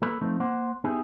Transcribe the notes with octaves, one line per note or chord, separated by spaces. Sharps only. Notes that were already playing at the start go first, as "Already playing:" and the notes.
A#3 A4 B4 B5
F3 A3 C4 D#4
A#3 C5 F#5
B3 D#4 E4 G4 G#4